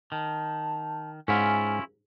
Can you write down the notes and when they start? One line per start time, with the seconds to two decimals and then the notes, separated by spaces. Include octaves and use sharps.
0.12 D#3 A5
1.28 G#2 C#4 E4 F4 G#5